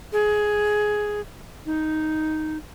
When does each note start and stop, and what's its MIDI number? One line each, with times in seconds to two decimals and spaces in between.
0.13 1.21 68
1.66 2.57 63